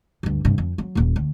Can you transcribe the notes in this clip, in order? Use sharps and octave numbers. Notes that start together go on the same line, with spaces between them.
D2 G2
G2 C3
F2
F#3
D#1 A#2
D2